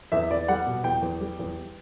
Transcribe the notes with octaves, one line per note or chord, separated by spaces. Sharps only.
E2 E5
E2 D5
G3 F#5
B2
E2 G5
E2
G3
E2